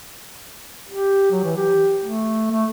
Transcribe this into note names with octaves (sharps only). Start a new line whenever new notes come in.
G4
F#3
E3
G4
A3
A3